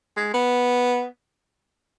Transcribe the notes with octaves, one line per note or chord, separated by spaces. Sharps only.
G#3
B3